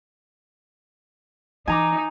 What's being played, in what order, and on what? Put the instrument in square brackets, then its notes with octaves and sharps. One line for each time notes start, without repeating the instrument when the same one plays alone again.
[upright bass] E3 [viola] D#4 [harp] G#5 A#5 D6